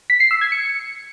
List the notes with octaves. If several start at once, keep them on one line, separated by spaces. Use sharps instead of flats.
B6
C7
E6
G#6
C#7